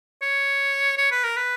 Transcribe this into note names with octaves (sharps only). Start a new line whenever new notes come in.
C#5
C#5
B4
A#4
B4